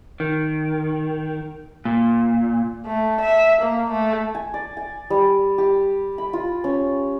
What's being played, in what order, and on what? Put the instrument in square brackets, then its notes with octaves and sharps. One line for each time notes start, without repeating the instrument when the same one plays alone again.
[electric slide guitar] D#3
A#2
[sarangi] A3
E5
A#3
A3
[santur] G#5
D5
G#5
G3
G4
B5
F4
C#4